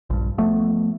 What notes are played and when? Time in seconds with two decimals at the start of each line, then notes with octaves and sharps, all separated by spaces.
0.10 A#1 G2
0.38 F3 A3 B3